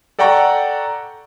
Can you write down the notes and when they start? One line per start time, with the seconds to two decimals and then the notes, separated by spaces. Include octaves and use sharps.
0.19 A4 D5 F#5 G5 A#5 C#6